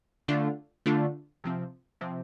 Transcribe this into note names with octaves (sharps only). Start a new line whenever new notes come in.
D3 A3 D4 F4
D3 A3 D4 F4
C3 F3 C4
C3 F3 C4